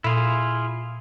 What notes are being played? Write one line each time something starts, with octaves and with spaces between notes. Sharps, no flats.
A#2 E4 F4 G#4